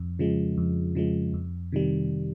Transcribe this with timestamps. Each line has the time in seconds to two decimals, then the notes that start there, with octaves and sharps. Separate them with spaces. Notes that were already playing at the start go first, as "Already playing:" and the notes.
Already playing: F2
0.19 C#3 F3 G#3
0.58 F2
0.95 C#3 F3 G#3
1.34 F2
1.72 C3 D#3 G3